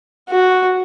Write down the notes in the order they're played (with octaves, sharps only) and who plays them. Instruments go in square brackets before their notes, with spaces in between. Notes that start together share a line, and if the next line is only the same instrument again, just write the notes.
[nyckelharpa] F#4